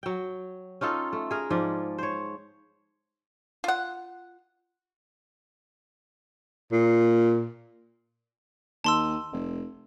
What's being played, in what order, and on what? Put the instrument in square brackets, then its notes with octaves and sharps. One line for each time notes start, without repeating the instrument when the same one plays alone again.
[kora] F#3 G5
C#4 D#4 F4 A4
A3
G#4 A#4
G#2 F3 D5
C5 C#5
[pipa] F4 F#5
[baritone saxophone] A#2
[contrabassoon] D#2 [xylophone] A5 C6 E6
[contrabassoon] F1